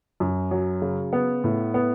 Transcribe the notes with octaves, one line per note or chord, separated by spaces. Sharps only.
F#2
F#3
C#3
B3
A2
B3